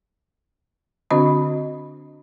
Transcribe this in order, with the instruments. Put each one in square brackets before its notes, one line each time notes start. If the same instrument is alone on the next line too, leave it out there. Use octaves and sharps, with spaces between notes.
[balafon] D3 C4 D4 F#4 D#5 B5